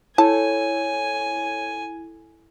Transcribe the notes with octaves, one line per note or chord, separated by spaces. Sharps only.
E4 A4 C#5 G#5 A5